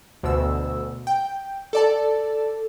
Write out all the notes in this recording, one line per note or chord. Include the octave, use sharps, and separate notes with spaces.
D2 B2 E6
G5
A4 D5 A5